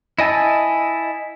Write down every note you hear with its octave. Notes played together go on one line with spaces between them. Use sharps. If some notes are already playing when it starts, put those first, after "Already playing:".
E4 D#5 G#5 A5 E6